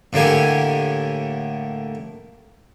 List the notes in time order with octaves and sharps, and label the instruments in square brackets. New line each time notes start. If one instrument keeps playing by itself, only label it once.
[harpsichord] A2 D3 A#3 G4 G#5